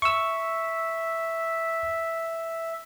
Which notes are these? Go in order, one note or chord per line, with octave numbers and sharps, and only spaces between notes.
E5 C#6 E6